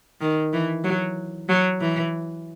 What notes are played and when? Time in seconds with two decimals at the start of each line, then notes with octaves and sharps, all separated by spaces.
0.21 D#3
0.53 E3
0.84 F#3
1.49 F#3
1.81 E3